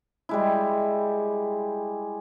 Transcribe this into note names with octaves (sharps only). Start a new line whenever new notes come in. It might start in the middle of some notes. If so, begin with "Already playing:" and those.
G3 G#3 E4